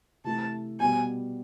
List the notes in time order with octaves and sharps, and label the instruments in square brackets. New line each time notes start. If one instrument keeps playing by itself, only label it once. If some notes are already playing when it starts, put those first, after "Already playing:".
[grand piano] C3 E3 A3 [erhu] A5
[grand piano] B2 G3 B3 [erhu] G#5